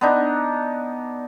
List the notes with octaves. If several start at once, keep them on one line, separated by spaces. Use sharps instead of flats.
B3 D4 D#4